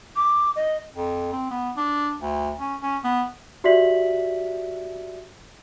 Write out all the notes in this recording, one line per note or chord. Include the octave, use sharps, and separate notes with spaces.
D6
D#5
F2
C4
B3
D4
D2
C#4
C#4
B3
F#4 G4 D5 E5 B6 F#7